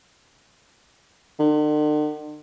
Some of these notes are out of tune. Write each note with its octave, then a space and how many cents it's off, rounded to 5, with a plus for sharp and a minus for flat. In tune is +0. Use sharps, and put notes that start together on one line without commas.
D3 +45